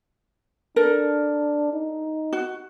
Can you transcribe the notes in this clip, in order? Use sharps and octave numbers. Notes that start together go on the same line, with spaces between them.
D4 A4 A#4
D#4
F#4